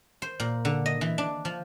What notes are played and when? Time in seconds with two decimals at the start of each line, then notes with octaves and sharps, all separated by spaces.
0.22 C5
0.40 A#2
0.65 D3
0.86 D#5
1.01 E3
1.18 D4
1.45 F3